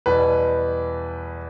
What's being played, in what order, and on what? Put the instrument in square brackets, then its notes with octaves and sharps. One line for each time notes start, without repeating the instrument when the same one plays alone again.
[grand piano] E2 B2 G3 B4